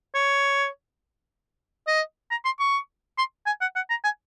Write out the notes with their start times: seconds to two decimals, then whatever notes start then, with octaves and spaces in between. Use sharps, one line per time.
0.15 C#5
1.88 D#5
2.31 A#5
2.45 C6
2.60 C#6
3.18 C6
3.47 G#5
3.61 F#5
3.76 F#5
3.90 A#5
4.04 G#5